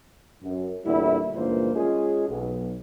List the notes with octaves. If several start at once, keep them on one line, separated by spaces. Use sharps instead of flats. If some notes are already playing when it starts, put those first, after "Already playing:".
F#2
E2 A#2 D3 G3 E4
C#2 G2 A#2 E3 A#3 C5
G#3 C#4 F4 G#4
B1